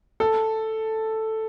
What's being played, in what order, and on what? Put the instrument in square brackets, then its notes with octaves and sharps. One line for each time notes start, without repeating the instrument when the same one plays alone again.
[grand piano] A4